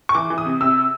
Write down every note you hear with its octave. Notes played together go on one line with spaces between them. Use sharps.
C#6
E3 D6
E3
D#6
C3
C3 E6